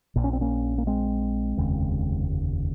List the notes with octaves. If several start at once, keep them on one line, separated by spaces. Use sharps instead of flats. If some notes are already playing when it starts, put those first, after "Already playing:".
A#1 A#2
C#4
C4
A#3 C#4
A#3
G#3 C4
F1 D#2 C#3